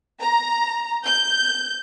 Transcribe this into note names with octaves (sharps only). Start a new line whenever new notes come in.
A#5
G6